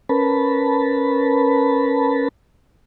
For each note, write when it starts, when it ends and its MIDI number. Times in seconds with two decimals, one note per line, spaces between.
0.09 2.28 61
0.09 2.28 70
0.09 2.28 71
0.09 2.28 81
0.09 2.28 83